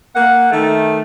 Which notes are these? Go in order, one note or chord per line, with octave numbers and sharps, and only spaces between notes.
A#3 F#5
D#3 A3